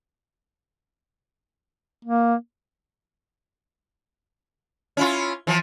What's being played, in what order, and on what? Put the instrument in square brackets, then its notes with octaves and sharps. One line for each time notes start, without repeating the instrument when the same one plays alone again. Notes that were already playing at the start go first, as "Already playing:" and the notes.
[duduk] A#3
[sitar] C#4 E4 F4
E3 F3